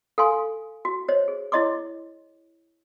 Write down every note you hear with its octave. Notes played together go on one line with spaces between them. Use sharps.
A4 F5 G#5 C6
F#4
C5 C#5 D#5
G#4
E4 C#5 D#5 C6 D6